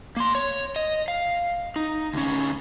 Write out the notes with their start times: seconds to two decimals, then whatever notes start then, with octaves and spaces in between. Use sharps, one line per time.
0.17 A#3 C6
0.35 C#5
0.76 D#5
1.08 F5
1.76 D#4
2.14 D2 C#4